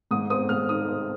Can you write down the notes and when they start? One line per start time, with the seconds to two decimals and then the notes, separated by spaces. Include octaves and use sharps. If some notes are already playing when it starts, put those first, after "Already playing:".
0.11 G#2 D#6
0.30 C4 D#6
0.49 G#2 F6
0.69 D#4 D#6
0.88 C4